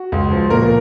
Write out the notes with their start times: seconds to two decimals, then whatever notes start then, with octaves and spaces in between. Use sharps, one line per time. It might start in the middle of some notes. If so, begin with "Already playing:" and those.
Already playing: F#4
0.12 C#2
0.31 F3
0.50 A#2 A#4